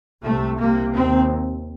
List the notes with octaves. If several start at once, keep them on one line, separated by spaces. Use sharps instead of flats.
C2 C3 A3
C2 C3 A#3
D#2 C4